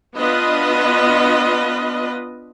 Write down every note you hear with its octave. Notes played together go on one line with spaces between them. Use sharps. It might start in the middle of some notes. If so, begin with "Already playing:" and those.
B3 D4 F4 B4 D#5